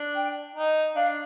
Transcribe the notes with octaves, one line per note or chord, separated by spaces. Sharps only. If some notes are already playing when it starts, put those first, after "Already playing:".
Already playing: D4
G5
D#4
D4 F5